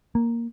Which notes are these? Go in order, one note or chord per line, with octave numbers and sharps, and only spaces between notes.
A#3